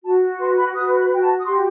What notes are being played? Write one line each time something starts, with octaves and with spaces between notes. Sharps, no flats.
F#4 A5
B4 C6
B5
F#4 D#6
B5
F#4 G5
A5
D#6
G4 C6